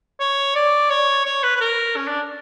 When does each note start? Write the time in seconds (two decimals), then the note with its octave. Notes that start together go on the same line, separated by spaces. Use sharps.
0.20 C#5
0.55 D5
0.90 C#5
1.25 C#5
1.43 B4
1.56 B4
1.61 A#4
1.96 C#4
2.08 D4